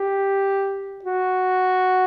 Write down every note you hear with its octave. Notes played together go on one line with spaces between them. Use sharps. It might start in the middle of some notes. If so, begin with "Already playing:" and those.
Already playing: G4
F#4